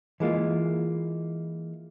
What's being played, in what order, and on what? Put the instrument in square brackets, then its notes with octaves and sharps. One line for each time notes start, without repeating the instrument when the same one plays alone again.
[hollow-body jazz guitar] E3 G#3 A#3 F4